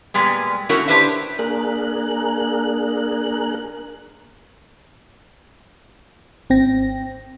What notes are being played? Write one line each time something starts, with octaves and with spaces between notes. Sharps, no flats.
A#2 G3 G#3 B3
A3 B3 C#4 E4 F#4 A#4
D4 E4 G4 B4 C5 E5
A#3 D4 G#4 A#4 F#6
G#1 C4 G5 A#6